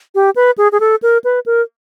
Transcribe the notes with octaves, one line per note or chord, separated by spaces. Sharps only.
G4
B4
G#4
G#4
A4
A#4
B4
A#4